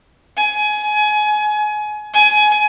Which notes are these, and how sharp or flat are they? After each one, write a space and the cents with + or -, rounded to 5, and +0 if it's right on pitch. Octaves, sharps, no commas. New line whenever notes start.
G#5 +25
G#5 +25